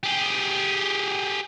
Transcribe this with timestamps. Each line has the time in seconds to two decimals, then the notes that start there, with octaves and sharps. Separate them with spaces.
0.03 G4 G#4